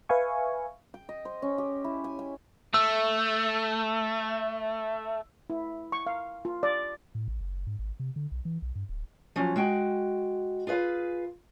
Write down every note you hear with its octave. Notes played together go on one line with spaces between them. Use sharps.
B4 E5 F5 G#5 C#6
G5
D#5
C5
C#4
G4
E4
G#5
G5
A3 E6
E4
C#6
F5
F4
D5
A2
A1
F#1
G#2
G#1
C3
D3
B1
E3
B1
G2
D1
F3 F#3 C#4
G#3 F#4 G5
F4 G#4 B4 F5